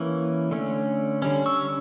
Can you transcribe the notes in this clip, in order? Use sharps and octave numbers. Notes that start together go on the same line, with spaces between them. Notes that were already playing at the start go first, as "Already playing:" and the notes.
Already playing: E3 A#3 C#4
D3 A3 C#4
D3 G3 C#4
C#6 E6